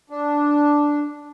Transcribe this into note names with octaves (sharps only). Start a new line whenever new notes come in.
D4